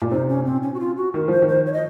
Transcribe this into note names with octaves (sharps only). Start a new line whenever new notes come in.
A#2
C3 D#4
C#4
C4
C#4
F#4
F4
F#4
D#3 A#4
F3 C5
D#3
C5
C#5
D#5